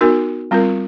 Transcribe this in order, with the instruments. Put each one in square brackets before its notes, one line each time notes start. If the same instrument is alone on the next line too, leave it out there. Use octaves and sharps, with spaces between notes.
[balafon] B3 D#4 F#4 A#4
G3 C4 F4 A#4